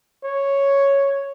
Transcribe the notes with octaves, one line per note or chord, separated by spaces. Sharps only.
C#5